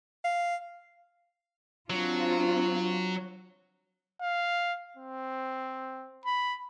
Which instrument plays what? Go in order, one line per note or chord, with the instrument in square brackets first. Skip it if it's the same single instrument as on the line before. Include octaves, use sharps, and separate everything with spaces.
[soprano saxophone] F5
[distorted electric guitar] F#3 [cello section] C4 D4 F4
[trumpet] F5
C4
B5